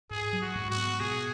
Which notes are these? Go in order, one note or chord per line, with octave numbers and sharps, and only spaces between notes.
G#2 G#4
F#3
F#4
G#2
F#4
B3
B2 G#4